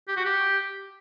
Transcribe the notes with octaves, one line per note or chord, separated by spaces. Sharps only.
G4
F#4
G4